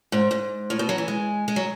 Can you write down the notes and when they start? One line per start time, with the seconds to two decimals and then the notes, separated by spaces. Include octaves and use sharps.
0.12 G#2
0.31 G#2
0.70 A2
0.79 B2
0.89 F#3
0.98 E3
1.08 G#3
1.48 G#3
1.56 F#3